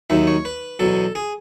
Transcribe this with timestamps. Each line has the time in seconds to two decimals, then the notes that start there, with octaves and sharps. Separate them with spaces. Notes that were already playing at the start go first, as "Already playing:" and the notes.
0.10 D#2 D#3 F#3 E5
0.27 C#5
0.45 B4
0.79 E2 B2 F#3 A4
1.15 G#4